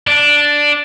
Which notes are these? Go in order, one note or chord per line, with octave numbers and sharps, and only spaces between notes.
D4